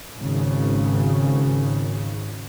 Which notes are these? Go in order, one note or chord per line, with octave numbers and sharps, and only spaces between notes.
G#1 C#3